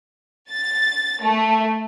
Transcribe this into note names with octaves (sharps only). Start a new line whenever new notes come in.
A6
A3